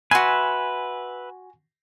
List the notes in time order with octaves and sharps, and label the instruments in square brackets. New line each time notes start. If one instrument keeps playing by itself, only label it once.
[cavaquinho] F#4 C6 [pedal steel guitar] B4 E5 [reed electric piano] G#5